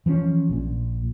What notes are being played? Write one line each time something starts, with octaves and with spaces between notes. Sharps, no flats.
E3 F3 B3 C#4
A#1 A#2